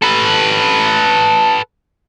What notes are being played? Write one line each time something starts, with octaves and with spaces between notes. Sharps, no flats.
A4 B4